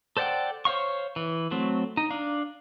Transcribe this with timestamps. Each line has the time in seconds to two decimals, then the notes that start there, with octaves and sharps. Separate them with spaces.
0.17 A4 C5 D5 F#5 G5
0.65 C5 C#5 F5 C#6
1.16 E3
1.51 F#3 A3 C4
1.97 D#4
2.11 D4 F5